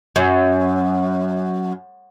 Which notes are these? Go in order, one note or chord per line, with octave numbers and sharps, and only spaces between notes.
F#2